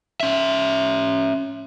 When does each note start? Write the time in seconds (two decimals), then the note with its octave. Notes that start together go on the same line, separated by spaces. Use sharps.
0.20 C#4 E5